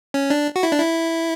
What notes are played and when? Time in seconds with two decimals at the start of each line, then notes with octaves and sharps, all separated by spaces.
0.14 C#4
0.30 D4
0.56 F#4
0.63 E4
0.72 D4
0.80 E4